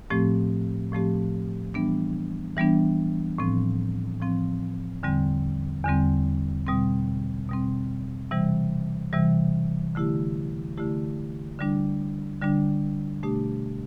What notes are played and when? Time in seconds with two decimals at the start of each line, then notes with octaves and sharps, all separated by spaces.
0.10 A2 F3 A3 C4 G4
0.92 A2 F3 A3 C4 G4
1.74 E3 G3 B3 D4
2.56 E3 G3 B3 D4
3.38 A2 F3 C4
4.21 A2 F3 C4
5.03 E2 D3 G3 C4
5.85 E2 D3 G3 C4
6.67 B2 G3 C4
7.49 B2 G3 C4
8.31 C3 E3 G3
9.13 C3 E3 G3
9.95 D3 A3 E4 G4
10.78 D3 A3 E4 G4
11.59 D3 G3 D4
12.41 D3 G3 D4
13.23 B2 A3 D4 G4